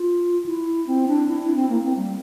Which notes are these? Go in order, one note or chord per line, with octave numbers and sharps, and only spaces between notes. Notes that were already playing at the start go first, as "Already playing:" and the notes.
Already playing: F4
E4
C4
D4
E4
E4
C4
A#3
C4
G3